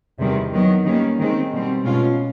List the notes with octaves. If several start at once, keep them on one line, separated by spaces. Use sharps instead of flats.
E2 C3 D#3 G3
D#3 F#3 B3
D#3 G3 A#3 C#4
D#3 G#3 C4
B2 G3 C4
B2 G#3 C#4 F4